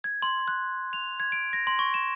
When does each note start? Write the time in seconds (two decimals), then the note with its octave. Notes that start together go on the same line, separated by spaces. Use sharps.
0.04 G#6
0.22 C6
0.48 F#6
0.93 F7
1.20 G#6
1.32 D7
1.53 A#6
1.67 C6
1.79 C#6
1.94 E7